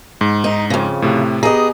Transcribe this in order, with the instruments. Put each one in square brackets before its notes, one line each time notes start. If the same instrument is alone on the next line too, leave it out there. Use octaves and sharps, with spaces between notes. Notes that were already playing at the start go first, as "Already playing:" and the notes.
[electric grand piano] G#2
[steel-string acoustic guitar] D#4
F2 C#3
[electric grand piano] A2 C3
[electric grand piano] B3 G4 A#5 [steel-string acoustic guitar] G#4 D#5